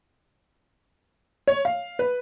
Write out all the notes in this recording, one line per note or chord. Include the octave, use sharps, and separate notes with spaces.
C#5
F5
B4